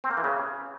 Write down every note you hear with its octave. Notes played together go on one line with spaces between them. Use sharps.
C4
A#3
E3
C#3